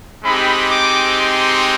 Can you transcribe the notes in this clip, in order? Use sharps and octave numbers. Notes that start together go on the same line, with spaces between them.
G#3 C4 D#4 G4 B5
D6
C6